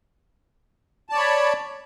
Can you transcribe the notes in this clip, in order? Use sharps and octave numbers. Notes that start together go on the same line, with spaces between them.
C#5 D5 A5 B5